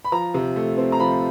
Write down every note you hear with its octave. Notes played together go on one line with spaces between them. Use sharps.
B5
F3 A#5
C3
A3
C4
A#5
F3 B5